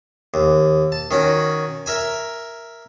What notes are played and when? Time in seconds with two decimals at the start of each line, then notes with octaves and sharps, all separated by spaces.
0.34 D#2
0.92 A5
1.11 D#3 C#4 F#4
1.86 A#4 E5 G#5